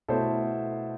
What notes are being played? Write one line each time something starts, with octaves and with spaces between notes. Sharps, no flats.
B2 A3 E4 A4 C5